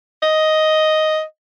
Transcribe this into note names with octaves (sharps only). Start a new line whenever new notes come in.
D#5